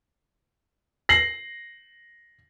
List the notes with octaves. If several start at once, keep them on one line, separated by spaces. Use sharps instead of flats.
A#6 C7 F#7